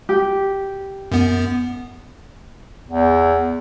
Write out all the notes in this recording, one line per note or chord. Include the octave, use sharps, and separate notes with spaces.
G4
F#2 B3
E2